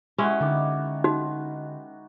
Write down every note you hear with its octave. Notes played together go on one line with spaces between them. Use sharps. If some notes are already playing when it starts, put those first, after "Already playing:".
G#3 C#4 E4 F#4
D3 D#3 D6
D#4 F#4